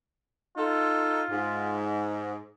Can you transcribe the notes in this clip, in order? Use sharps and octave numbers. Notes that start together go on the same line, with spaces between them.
D#4 F4 A4
G#2